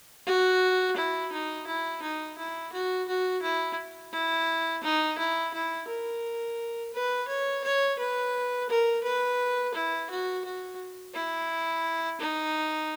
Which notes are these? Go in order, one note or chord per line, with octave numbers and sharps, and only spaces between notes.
F#4
E4
D#4
E4
D#4
E4
F#4
F#4
E4
E4
D#4
E4
E4
A#4
B4
C#5
C#5
B4
A#4
B4
E4
F#4
F#4
E4
D#4